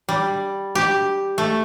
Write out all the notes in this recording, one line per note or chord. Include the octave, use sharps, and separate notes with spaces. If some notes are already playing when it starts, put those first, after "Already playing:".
G3
G4
A3